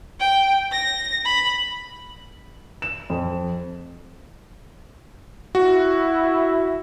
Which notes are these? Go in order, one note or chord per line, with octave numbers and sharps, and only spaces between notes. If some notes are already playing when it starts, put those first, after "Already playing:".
G5
A#6
B5
E7
F2
E4 F#4